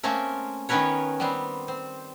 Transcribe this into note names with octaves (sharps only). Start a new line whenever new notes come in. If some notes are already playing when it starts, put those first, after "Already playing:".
A3 A#3 C4 C#4 A#4
D#3 B3 C#4 A#4 B4 C#5
G3 B3 C4
C4